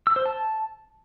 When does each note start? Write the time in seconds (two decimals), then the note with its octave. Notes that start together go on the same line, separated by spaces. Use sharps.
0.07 E6
0.16 C5
0.26 A5